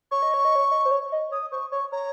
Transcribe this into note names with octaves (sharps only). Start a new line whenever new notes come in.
C#5 C#6
D#5
C#5
D#5
C#5
D#5
C5
C#5
D#5
C#5 D#6
C5 C#6
C#5 C#6
C#5 A#5